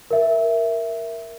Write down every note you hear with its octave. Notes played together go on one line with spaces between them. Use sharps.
A#4 E5